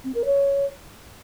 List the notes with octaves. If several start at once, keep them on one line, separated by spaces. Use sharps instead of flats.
C4
A#4
C#5